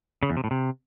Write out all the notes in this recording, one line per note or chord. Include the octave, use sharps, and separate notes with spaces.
C#3
E2
C3
A2
C3